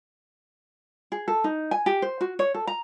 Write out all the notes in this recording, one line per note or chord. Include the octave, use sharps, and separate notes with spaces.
G#4
A4
D#4
G#5
G4
C5
F#4
C#5
A4
A#5